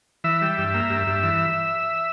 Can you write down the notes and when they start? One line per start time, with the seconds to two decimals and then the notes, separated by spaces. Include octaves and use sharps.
0.24 E3 E5
0.42 G3
0.58 G2
0.74 A#3
0.90 G2
1.07 G2
1.23 E3